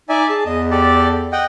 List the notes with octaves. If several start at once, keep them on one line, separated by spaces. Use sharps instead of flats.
D#4 D5 E5 G#5
G#4 A5
E2 D#5
G4 A4 D5
D#5 F#5 G5